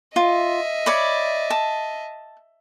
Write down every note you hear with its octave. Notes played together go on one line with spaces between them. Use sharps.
F4 D#5 E5
C#5 D5 B5
A5